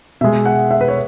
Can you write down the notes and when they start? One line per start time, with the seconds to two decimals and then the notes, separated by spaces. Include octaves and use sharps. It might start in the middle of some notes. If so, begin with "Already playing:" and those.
0.21 B2 G#3 E5
0.46 F#5
0.71 E5
0.81 B4
0.88 C#5